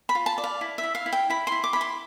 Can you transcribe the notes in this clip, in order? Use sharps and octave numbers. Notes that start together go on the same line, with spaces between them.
B5
F4
A5
D5
F5
E4
E5
E4
F5
E4
G5
E4 B5
E4 C6
D6
E4 B5
C6